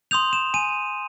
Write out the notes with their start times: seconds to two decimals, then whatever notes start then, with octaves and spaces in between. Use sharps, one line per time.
0.11 C6 D#6 G6 F7
0.33 E7
0.54 G#5 D#7